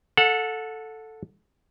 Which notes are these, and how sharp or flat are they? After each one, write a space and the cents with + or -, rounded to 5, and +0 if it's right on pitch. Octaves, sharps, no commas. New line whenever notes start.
A4 +0 F#5 -30